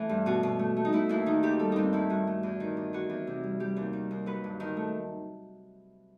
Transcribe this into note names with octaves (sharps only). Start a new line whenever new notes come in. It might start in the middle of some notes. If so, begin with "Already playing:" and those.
Already playing: E3 A3
G2
B2 F#4
B2
A3
A3
D#4
A3 E4
D#2 E4
D#3 D#4
D#2 G4
G3 A4
G2 C4 D#4
D#3 E4
G2 F#4
A3
E2
D#3
E2
E3 F#4
E2
C3
G3
G3 G4
D#2
D#3
D#2
F#3 B4
G2
D#3
A3